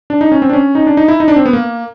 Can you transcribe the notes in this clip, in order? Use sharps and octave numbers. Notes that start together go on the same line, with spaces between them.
D4
D#4
C#4
C4
D4
C#4
D#4
D4
D#4
E4
D#4
D4
C4
B3
A#3